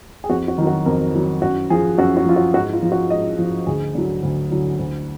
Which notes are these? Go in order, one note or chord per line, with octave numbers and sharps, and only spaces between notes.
G#4
F2 F#4
F#4
D#3 F#3
F#4
F2 A#4
D#3 F#3
F#2 F#4
F3 G#4
F#2 F#4
F#4
F3 F4
F#4
G#2 F#4
F4
F3
F#4
G#2 D#5
F3
D2 G#4
D3 F#3
D2
D3 F#3
D2